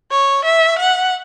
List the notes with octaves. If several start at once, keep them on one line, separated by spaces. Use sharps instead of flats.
C#5
E5
F#5